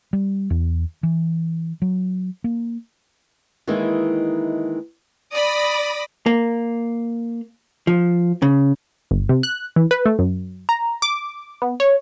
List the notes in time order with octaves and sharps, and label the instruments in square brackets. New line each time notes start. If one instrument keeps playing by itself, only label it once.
[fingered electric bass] G3
E2
E3
F#3
A#3
[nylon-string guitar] D#3 E3 G#3 A#3 D#4 E4
[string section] D5 B5 D#6 A#6
[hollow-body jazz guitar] A#3
F3
C#3
[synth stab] G1
C3
F#6
E3
B4
A3
F#2
A#5
D6
B3
C#5